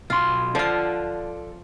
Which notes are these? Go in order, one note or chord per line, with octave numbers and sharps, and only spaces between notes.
B1 F4 C6
F3 F4 A4 D5